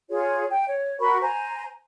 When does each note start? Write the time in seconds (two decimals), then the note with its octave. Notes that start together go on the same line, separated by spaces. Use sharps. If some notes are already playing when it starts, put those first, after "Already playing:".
0.10 F4 G#4 C#5
0.50 G5
0.68 C#5
1.00 F#4 A#4 B5 C#6
1.21 C5 G#5 A#5